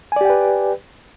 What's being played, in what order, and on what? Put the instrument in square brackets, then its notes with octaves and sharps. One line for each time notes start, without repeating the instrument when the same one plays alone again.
[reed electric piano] G#5
D5
G4
G5
B4